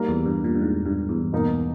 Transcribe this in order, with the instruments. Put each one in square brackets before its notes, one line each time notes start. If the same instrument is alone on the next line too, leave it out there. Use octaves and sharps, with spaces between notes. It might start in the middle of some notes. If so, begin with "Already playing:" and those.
Already playing: [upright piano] G3 A#3 D#4
[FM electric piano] E2
G2
A#2
G2
G#2
G2
E2
[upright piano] B2 A#3 D#4